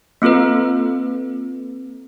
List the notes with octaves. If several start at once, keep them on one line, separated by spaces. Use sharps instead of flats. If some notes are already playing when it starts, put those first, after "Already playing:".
A#3 C4 F4 A4 B4